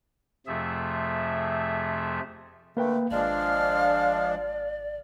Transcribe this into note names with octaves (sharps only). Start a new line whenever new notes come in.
F2 C3 F3 A3 G#4 E5
D3 A3 A#3 B4 G5
G#1 F3 G#3 D4 D5 F5